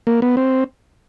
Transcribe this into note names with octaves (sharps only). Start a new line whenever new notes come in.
A#3
B3
C4